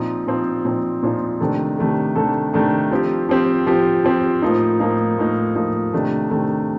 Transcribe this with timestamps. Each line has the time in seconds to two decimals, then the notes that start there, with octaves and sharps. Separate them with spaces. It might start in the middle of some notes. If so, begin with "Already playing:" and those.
Already playing: A#2 F3 C4 D#4
0.27 A#2 F3 C4 D#4
0.65 A#2 F3 C4 D#4
1.03 A#2 F3 C4 D#4
1.40 C3 D#3 A3 D4 A4
1.78 C3 D#3 A3 D4 A4
2.15 C3 D#3 A3 D4 A4
2.53 C3 D#3 A3 D4 A4
2.91 F3 C4 G4
3.29 F3 C4 G4
3.67 F3 C4 G4
4.04 F3 C4 G4
4.42 A2 F3 A#3 D#4
4.80 A2 F3 A#3 D#4
5.18 A2 F3 A#3 D#4
5.55 A2 F3 A#3 D#4
5.93 C3 D#3 A3 D4
6.31 C3 D#3 A3 D4